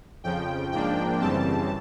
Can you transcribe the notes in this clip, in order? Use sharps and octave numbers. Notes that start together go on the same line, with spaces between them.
F2 C#3 F3 G5
G#2 F3 A#3 D4 G5
F#2 C#3 E3 G3 C4 A5